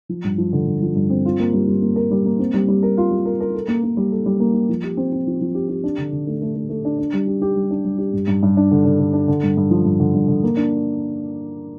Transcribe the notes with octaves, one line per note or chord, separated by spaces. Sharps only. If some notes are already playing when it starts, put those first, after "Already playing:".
F3
G2
F3
D3
G2
F3
G2
C4
F4
A#3
G3
G3
A#3
A#4
G3
A#3
C4
G3
G3
A#4
F4
G3
A#4
A#4
A4
A#3
A#3
G3
A4
G3
A#3
A#3
F3
G4
C4
C4
F3
F3
G4
G4
D4
D3
D3
A3
A3
A3
A3
D4
D4
G3
G4
G4
G3
D4
G3
G4
G2
G2
G2
D4
D3
D3
D3
D4
D3
G2
G2
F3
G2
D3
G2
D3
A#3
D4